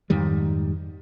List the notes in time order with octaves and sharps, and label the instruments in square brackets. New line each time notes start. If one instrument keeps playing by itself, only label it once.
[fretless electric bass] F2 G#2 D#3 G3